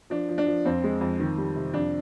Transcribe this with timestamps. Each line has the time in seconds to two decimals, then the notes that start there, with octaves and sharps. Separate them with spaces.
0.10 F3 D4
0.29 F3
0.38 D4
0.47 F3
0.65 F2 C4
0.84 G#3
1.01 F2
1.20 D#3
1.38 G3
1.56 C3
1.74 F2 D4